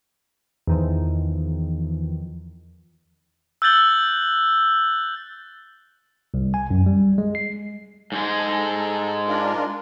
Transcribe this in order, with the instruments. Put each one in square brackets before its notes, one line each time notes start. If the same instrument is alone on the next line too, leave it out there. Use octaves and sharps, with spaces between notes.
[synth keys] E2 D#3 F3
[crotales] E6 F#6 G6 A6 F#7 G7
[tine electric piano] C2
G#5
F#2
G3
G#3
C7
[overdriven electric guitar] G#2 G#3
[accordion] A4
D4 F4 A#4